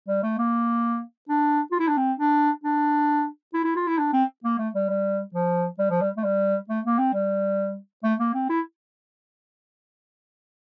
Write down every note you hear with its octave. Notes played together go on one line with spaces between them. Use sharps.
G3
A3
A#3
D4
F4
E4
D4
C4
D4
D4
E4
E4
F4
E4
D4
C4
A#3
A3
G3
G3
F3
G3
F3
G3
A3
G3
A3
A#3
C4
G3
A3
A#3
C4
E4